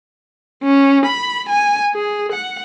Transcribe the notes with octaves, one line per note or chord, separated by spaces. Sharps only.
C#4
B5
G#5
G#4
F#5